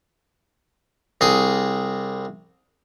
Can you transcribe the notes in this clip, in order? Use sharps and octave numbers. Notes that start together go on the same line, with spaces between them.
C2 G#4